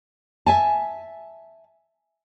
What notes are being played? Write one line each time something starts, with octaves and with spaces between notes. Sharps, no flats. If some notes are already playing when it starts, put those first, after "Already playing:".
E5 G#5 A5